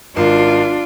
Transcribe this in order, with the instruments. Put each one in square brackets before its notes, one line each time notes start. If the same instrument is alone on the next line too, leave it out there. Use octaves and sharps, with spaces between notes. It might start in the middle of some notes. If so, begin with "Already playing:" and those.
[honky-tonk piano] G#1 [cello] D4 F4